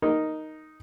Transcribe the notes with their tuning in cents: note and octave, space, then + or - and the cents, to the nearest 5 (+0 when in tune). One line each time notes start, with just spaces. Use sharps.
D#4 +0 A#4 +0